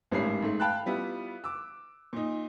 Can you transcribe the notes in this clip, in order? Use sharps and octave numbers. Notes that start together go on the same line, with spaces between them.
G#1 A2 G3 C#4 C7
G#2 A3
F5 G5 A5 B5 F#6
G3 B3 E4 F4
D6 E6
A#2 D#4